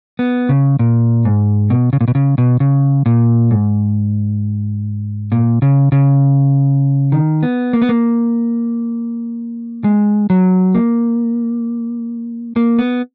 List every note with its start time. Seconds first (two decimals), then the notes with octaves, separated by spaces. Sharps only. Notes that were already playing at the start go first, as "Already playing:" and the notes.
0.19 B3
0.49 C#3
0.79 A#2
1.25 G#2
1.70 B2
1.93 C#3
2.01 A#2
2.08 B2
2.15 C#3
2.38 B2
2.60 C#3
3.06 A#2
3.51 G#2
5.32 A#2
5.62 C#3
5.92 C#3
7.12 D#3
7.43 B3
7.73 A#3
7.82 B3
7.89 A#3
9.84 G#3
10.30 F#3
10.75 A#3
12.56 A#3
12.79 B3